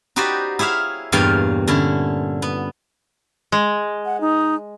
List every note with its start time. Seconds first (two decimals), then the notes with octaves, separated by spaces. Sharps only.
0.16 D#4 F#4 G4 B4 C5 D5
0.59 E4 G#4 C#5 E5 F5
1.12 E2 G2 A#2 C#5 F5 G5
1.68 D3 C#4 E4
2.42 B3
3.52 G#3
4.05 F#5
4.21 D#4